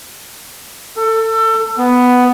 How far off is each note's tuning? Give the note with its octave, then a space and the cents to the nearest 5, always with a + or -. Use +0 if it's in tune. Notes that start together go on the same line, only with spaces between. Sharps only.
A4 +25
B3 +5